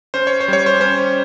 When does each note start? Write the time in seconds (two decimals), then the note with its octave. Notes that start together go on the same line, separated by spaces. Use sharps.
0.14 C#4 C5
0.27 C#5
0.41 C5
0.48 G3 C#5
0.66 C5
0.80 C#4 C5